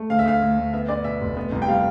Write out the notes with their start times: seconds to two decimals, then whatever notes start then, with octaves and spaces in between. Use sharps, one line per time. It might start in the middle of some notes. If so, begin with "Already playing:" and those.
Already playing: A3
0.10 D2 F5
0.19 E5
0.25 D2 F5
0.42 D2
0.58 D2
0.73 B3 E5
0.88 B3 D5
1.04 B2 E5
1.21 F1
1.37 B3
1.52 C2
1.62 G5
1.68 G3 F5